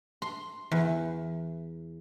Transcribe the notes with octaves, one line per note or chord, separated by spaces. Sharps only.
C6
E2